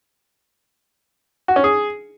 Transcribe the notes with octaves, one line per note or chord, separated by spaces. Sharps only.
F#4
C#4
G#4